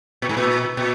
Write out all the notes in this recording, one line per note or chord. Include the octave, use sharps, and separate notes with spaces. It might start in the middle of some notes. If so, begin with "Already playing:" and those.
A#2
G#2
A#2
A#2